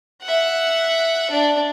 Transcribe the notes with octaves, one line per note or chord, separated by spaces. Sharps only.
E5 F#5
D4 D5